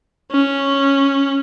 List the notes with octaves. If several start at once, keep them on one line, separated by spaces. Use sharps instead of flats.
C#4